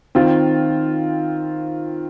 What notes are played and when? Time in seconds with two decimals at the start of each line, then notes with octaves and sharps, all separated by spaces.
0.15 D#3 C4 F4